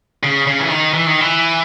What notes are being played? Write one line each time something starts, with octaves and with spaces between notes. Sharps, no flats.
C#3
C#3
E3
D#3
E3
D#3
E3